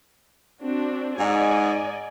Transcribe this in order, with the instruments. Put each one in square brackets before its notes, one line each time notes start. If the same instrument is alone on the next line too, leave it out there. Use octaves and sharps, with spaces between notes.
[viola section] C4 D4 F#4
[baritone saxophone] G#2 [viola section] D5 D#5 G#5